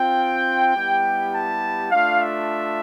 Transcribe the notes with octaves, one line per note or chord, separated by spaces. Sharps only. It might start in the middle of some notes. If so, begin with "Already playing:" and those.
Already playing: C4 F4 G5
G3 B3 E4 G4
A5
A3 D4 F4 F5
E5